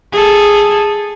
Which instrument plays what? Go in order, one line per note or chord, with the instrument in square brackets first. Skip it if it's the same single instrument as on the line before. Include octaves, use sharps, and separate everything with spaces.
[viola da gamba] G#4 A4